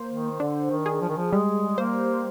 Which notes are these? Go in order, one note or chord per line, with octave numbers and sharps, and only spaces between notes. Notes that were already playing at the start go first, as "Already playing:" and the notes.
Already playing: A#3 C5
D#3
D3 D4
D#3
G#4
F3
D#3
F3
G3 G#3
A#3 C5